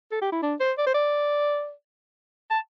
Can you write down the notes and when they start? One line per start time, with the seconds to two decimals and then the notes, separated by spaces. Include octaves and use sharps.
0.12 A4
0.22 G4
0.32 E4
0.42 D4
0.60 C5
0.78 D5
0.86 C5
0.94 D5
2.51 A5